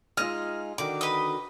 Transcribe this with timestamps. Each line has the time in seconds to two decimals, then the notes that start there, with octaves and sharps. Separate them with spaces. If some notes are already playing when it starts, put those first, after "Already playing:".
0.17 G#3 D#4 F4 D#5 F6
0.78 D3 D#3 F#4 D6
1.01 B4 D#5